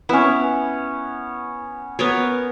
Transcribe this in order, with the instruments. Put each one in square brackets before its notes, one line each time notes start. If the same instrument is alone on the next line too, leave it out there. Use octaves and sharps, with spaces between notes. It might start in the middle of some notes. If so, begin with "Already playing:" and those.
[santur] B3 C#4 [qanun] E4
[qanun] B3 A#4 C#5